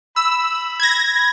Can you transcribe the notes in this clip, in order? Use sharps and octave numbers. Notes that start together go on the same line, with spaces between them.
B5 E6
G#6 A#6